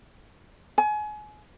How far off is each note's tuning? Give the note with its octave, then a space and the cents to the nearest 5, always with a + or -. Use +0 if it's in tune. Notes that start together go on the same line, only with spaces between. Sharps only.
G#5 +30